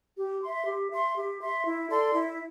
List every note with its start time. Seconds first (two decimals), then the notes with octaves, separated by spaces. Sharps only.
0.17 G4
0.41 E5 C6
0.65 G4
0.90 E5 C6
1.15 G4
1.40 E5 C6
1.65 E4
1.89 A4 D5 C6
2.14 E4